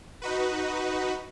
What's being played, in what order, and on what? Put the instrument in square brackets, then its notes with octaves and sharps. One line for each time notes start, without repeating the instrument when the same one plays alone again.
[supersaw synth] D#4 F#4 B4